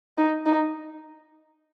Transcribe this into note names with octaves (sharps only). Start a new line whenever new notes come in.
D#4
D#4